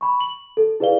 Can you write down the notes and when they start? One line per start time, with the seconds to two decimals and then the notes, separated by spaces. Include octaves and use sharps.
0.01 B5 C#6
0.21 F#7
0.57 A4
0.80 E4 G#4 B4 D5 F5 G7